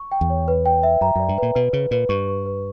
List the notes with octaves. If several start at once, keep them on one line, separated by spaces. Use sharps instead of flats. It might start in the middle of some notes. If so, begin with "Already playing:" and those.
Already playing: C#6
G5
E2
C#5
B4
G5
E5
F#2 A#5
F#2 D5
G2
A#2 B4
B2 B4
C#3 B4
A#2 B4
G2 C#6
C#6
B4